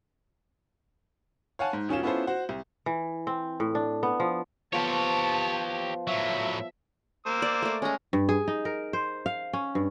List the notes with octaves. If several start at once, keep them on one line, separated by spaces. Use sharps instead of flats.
C#5 F5 F#5 G#5 A5
G#2
E1 C#4 F4 E7
B3 C#4 E4 F4 A4 C5
F#4 C5
C2
E3
C4
A2
D4
B3
F3
F3 B3 G4 C5 C#5 A5
A2 F#3 E5
A#3 C5 E6
D5
A3 D5
G#3 C#4 A#5
G2
G#4
D#4
A#4
C5
F5
C#4
G2